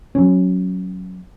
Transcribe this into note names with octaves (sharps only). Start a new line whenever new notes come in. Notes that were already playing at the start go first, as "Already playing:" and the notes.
F#3 C#4